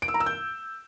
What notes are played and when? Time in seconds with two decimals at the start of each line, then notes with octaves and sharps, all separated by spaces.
0.02 D7
0.08 E6
0.14 A#5
0.20 E6
0.26 G6